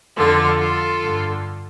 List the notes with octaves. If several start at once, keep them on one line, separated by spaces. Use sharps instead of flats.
F2 D3 F4 A4
F4 A4
G2 D3